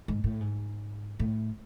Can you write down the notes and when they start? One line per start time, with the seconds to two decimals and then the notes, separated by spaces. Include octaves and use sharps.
0.08 G#2
0.24 A2
0.41 G#2
1.20 A2